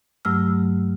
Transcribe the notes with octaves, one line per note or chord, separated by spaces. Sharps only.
G2 F#3 A3 E6 F6